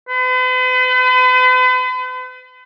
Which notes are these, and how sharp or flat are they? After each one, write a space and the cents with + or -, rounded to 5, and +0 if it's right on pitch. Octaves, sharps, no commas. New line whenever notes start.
B4 +45